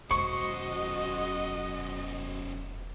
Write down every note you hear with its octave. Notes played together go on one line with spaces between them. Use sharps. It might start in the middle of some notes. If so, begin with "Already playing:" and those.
E1 F#2 F#4 C5 D#5 C#6